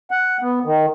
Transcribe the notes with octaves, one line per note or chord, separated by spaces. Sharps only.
F#5
B3
D#3